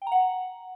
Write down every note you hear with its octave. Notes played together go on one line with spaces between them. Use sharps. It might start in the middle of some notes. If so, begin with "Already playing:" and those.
G5
A#5
F#5